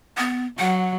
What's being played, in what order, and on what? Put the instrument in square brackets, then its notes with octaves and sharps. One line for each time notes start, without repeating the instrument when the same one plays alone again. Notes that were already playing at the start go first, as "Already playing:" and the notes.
[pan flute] B3
[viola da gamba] F#3 [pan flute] F#5